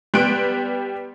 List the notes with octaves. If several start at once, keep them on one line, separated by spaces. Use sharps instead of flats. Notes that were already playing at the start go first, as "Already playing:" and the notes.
G3 B3 G5 C6 F#6 D7